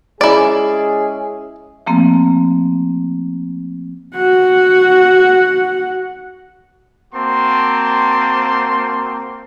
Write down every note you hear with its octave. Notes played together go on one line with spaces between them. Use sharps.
G#3 C#4 E4 G#4 D5
F3 A3 A#3 C4
F#4 F#5
A#3 C4 F#4 A5 C6